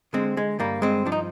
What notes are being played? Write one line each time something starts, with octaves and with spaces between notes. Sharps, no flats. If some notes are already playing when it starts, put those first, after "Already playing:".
D3 G#3 C4
G#3
G2 G3 A#3
G#3 C4
F3 D4
D#4